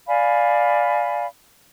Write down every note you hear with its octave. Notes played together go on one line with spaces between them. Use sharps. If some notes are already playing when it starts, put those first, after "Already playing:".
D5 F5 G#5 B5